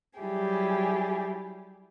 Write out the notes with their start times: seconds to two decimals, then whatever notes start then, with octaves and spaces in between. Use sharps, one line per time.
0.19 F#3 G3 E4 G4 G#4